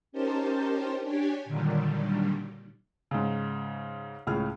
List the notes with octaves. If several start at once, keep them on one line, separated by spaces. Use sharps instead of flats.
C#4 D#4 G4 A#4 C5 A5
D4 G4 C#5 G#5
A#2 D3 D#3 F#3 G3
G#2 C#3
C#2 A2 C#3 G#4 F6